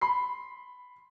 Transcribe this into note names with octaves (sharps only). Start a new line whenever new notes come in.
B5 C6 C7